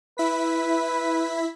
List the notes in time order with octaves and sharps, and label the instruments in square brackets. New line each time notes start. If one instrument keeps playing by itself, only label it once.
[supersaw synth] E4 B6 [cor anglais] B4